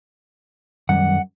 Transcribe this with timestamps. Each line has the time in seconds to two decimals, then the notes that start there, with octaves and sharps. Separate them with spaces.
0.89 F#2 D#3 G3 F#5